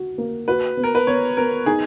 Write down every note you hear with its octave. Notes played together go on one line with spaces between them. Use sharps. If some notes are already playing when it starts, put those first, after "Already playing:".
Already playing: F#4
A#3
F#4 B4
B3
A#4
B4
B3 C#5
B3 A#4
D#4 G#4